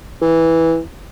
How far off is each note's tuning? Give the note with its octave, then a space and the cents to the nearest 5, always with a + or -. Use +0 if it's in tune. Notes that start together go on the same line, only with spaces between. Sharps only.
E3 -5